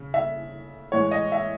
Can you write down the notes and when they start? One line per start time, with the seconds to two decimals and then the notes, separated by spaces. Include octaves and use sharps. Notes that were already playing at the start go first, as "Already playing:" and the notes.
Already playing: C#3
0.14 E5
0.92 A2 E3 G#3 C#5
1.11 D#5
1.32 E5